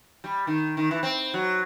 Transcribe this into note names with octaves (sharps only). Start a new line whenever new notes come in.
G3
D#3
D#3
E3
C4
F#3